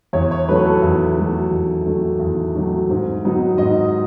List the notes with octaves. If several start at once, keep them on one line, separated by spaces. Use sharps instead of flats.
E2 C#5
C#5
D#3 F#3 A3 B4
A4
E2
D#3 F#3 A3
E2
D#3 F#3 A3
E2
D#3 F#3 A3
G#2
D#3 F#3 B3 D#4
G#2 D#5